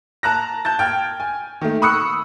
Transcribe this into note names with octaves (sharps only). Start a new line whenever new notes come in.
A5 A#5 F#6 A#6
A5 G6 A6
G5 F6 G#6
G#5
D#3 A3
B5 C#6 D#6 E6 F#6 C#7